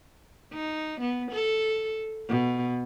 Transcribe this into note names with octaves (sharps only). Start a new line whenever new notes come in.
D#4
B3
A4
B2